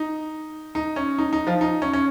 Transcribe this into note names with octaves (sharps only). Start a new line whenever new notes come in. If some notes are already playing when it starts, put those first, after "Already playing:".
Already playing: D#4
D#4
C#4
D#4
D#4
F3 F4
D#4
C#4
C#4